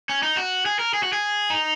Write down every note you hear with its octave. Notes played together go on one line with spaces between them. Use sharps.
C#4
D#4
F#4
G#4
A#4
G#4
F#4
G#4
D#4